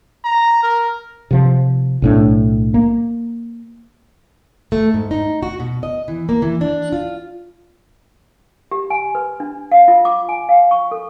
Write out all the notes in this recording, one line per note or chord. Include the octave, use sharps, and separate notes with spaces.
A#5
A#4
C3 F3
B1 A2 D4
A#3
A3
G#2
D#4
F#4
B2
D#5
E3
A#3
E3
D4
F4
G4
G#5
B4
D4
F5
F4
D6
G#5
F5
C#6
A4